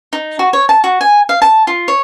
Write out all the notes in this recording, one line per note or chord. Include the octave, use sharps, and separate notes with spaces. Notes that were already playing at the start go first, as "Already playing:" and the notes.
D#4
F#4
C#5
A5
F#4
G#5
F5
A5
F4
C#5